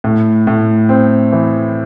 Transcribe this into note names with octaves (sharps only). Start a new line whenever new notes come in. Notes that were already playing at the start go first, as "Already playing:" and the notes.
A2
A2
C4
E3